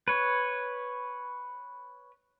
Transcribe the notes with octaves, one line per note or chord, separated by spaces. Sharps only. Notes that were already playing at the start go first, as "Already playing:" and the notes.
B4 C#5